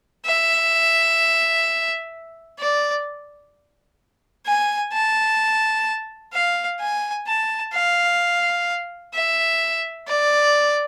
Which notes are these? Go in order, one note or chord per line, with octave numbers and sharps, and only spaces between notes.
E5
D5
G#5
A5
F5
G#5
A5
F5
E5
D5